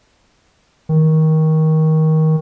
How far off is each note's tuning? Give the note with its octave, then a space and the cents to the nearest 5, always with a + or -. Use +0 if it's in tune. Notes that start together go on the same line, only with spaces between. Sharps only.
D#3 +20